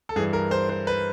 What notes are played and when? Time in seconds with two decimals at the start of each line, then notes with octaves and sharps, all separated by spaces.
0.09 A4
0.16 G2 E3 G#4
0.33 A#4
0.51 C5
0.69 C5
0.87 B4